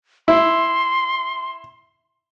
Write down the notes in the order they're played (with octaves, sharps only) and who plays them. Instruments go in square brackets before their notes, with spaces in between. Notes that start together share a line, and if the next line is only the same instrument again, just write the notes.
[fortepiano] E4 [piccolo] C6